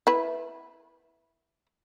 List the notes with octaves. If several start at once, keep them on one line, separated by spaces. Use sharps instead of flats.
E4 B4